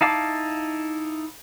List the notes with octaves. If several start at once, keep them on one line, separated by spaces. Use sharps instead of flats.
D#4 E4 F5 A5 D6